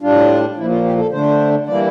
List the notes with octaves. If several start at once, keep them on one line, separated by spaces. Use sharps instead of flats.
A2 G3 D4 F4
A#2 F3 A#3 E4
F4
G4
A4
D3 A3 D4 C5
E3 G3 A#3 E4 D5